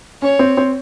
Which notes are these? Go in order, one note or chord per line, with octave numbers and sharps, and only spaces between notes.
C#4 C#5
C4
C4